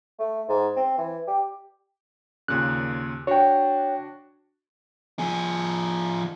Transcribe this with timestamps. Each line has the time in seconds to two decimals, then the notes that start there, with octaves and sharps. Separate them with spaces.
0.19 A3
0.49 G#2
0.76 C4
0.98 E3
1.27 G4
2.48 D#2 A#2 C#3 F#6
3.27 D4 F#4 C#5 G5
5.19 F3 G#4